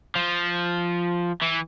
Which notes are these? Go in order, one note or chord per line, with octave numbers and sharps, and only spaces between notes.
F3
E3